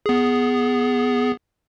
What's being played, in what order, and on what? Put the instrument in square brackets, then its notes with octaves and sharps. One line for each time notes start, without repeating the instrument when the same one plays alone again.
[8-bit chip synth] B3 G#4